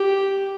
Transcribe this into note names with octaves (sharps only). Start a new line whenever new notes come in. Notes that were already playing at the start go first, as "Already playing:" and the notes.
Already playing: G4